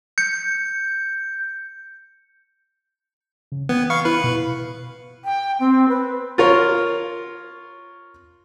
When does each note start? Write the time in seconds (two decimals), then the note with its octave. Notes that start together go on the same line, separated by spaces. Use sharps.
0.18 G6 C#7
3.52 C#3
3.69 E3 B3 G5 G#6
3.90 F5 B5 C#6 C7 C#7
4.05 E4 B4
4.24 B2
5.24 G5
5.59 C4
5.89 B4
6.38 F4 A#4 C#5